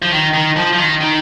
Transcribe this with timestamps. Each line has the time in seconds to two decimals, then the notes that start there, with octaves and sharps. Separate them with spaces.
0.02 F3
0.11 D#3
0.34 D#3
0.56 F3
0.73 F3
0.78 D#3
1.01 D#3